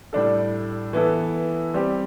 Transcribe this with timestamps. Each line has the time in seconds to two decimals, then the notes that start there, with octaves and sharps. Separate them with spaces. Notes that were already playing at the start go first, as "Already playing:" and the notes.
0.13 A2 G3 D4 A4
0.93 E3 B3 E4 A4
1.74 G3 C4 G4